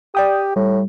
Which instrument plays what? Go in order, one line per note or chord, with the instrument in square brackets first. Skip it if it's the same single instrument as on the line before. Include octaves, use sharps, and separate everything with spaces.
[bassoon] G4 [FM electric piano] D5 G5 D#6
[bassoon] A2 [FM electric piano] G3